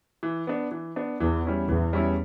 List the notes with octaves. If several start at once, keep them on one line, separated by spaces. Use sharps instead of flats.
E3
B3 D4
E3
B3 D4
E2 E3
G3 C#4 E4
E2 E3
G3 C#4 E4